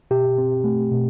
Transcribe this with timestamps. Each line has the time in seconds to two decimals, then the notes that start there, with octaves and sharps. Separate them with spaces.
0.11 B2 G4
0.38 C4
0.64 A3
0.91 B2